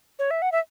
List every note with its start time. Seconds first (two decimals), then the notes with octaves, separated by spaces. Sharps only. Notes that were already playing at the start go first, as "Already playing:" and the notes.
0.19 C#5
0.31 E5
0.42 F#5
0.52 E5